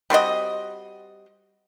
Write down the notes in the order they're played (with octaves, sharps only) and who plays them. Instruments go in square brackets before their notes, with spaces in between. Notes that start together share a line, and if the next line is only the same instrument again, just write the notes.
[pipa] G3 C4 F#4 D#5